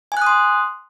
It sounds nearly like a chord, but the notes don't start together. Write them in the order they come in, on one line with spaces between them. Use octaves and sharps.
G#5 F#6 D#6 C6